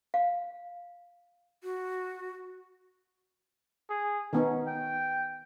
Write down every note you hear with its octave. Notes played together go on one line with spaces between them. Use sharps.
F5
F#4
G#4
D#3 B3 C#4 D#4
G5